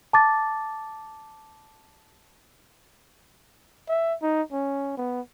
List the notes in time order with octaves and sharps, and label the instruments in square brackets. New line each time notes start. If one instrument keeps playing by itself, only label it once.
[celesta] A5 D6 A6
[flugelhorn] E5
D#4
C#4
B3